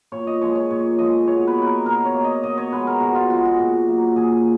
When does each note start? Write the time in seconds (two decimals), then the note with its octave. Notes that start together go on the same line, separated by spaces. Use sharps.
0.12 A#2 C#5
0.27 D#5
0.41 F3 G#3 C#5
0.55 C#5
0.70 A#2 C#5
0.99 F3 G#3 D#5
1.27 B2 C#5
1.47 B4
1.57 A#3
1.62 A#4 B4
1.86 B2 A#4
2.05 C#5
2.14 A#3
2.24 D#5
2.43 B2 D#5
2.58 C#5
2.73 G#3 B3 B4
2.87 A#4
3.01 B2 F#4
3.15 F4
3.30 G#3 B3 F#4
3.45 F#4
3.59 A#2
3.88 F#3 A#3
4.16 A#2 G#4